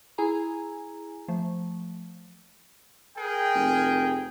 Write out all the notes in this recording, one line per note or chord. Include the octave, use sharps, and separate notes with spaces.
E4 G#4 G#5 A#5
F3 A3
G#4 A#4 G5
F1